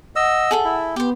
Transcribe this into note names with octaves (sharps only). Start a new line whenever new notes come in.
D#5 F#5 E6
G#4 A4 E5
E4
B3 G4 C5